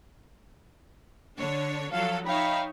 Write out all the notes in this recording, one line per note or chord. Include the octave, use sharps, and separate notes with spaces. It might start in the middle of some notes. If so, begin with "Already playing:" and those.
D3 D4 C#5
F3 F#3 A4 F5
D#4 C#5 E5 F5 G5 B5